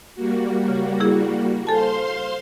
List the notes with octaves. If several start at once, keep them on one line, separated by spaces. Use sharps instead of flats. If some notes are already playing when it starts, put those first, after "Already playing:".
G3 A#3 F#4
C#3
E4 G#4
A4 C5 F5 G#5 A5 C6